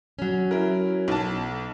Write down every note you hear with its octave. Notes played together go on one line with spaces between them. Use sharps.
F#3 C#4
E4 A#4
B1 A5